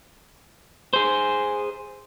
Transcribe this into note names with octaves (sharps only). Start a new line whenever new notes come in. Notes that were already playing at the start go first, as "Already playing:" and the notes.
G#4 C5